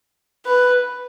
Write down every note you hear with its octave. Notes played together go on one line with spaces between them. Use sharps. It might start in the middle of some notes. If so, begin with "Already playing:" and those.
B4